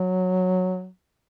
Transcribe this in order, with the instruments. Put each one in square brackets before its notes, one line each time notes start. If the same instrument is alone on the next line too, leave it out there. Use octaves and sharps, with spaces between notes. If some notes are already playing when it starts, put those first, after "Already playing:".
Already playing: [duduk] F#3